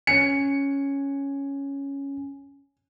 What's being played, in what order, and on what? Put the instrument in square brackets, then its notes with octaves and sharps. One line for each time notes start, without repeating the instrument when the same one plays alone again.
[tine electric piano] C#4 G#5 [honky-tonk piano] C#7